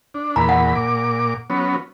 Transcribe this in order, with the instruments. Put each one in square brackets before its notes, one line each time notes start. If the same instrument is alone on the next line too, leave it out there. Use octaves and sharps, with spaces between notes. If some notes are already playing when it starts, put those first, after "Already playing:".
[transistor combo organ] D4
[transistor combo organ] E2 A#2 B5 [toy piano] A#5
[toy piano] F#5
[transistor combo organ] A#2 D6
F#3 B3 C#4